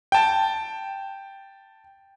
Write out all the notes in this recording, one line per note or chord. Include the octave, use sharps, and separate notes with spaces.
G5 A5